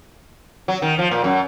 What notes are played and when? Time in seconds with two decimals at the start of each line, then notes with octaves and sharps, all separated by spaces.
0.68 F#3
0.82 D#3
0.99 F3
1.11 A#2
1.24 F#2